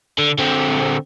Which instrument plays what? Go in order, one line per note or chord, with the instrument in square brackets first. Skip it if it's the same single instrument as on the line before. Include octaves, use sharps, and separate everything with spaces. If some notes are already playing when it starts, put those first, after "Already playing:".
[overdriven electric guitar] D3
D3 C4